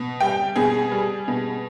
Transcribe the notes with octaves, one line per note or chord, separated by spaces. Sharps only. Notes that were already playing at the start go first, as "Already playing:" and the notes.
Already playing: B2
G3 G5
B2 G#4
G3
B2